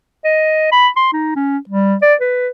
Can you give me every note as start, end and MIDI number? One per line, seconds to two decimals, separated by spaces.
0.25 0.69 75
0.72 0.88 83
0.96 1.09 84
1.13 1.31 63
1.36 1.58 61
1.69 1.96 55
2.02 2.15 74
2.21 2.49 71